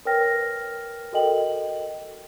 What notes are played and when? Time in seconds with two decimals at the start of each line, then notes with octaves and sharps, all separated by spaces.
0.05 A#4 B4 C#5 G5 F6 A#6
1.13 F#4 A4 A#4 D#5 G5 F#7